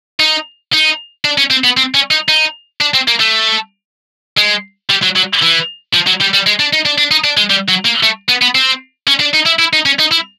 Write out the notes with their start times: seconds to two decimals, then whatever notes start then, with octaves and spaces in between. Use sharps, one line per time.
0.20 D#4
0.73 D#4
1.25 D4
1.38 C#4
1.50 C4
1.64 B3
1.77 C4
1.94 C#4
2.11 D#4
2.28 D#4
2.81 D4
2.94 C4
3.08 A#3
3.20 A3
4.37 G#3
4.90 G3
5.03 F#3
5.16 F#3
5.42 E3
5.94 F3
6.07 F#3
6.21 G3
6.33 G3
6.46 G#3
6.59 D4
6.73 D#4
6.85 D4
6.98 D4
7.11 D#4
7.24 D4
7.37 G#3
7.50 G3
7.69 F#3
7.85 A#3
8.03 A3
8.28 B3
8.42 B3
8.55 C4
9.08 C#4
9.20 D4
9.34 D#4
9.46 E4
9.59 E4
9.73 D#4
9.86 C#4
9.99 D#4
10.12 E4